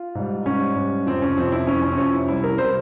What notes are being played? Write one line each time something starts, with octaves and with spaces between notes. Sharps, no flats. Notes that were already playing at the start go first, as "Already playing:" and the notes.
Already playing: F4
G#2 G3
G#2 G3 C#4
G#2 G3
F2 C3 F3 C4
C#4
F2 C3 F3 C4
E4
F2 C3 F3 C#4
C#4
C4
F2 C3 F3 C#4
E4
C2 C3 G3 E4
A#4
C3 G3 C5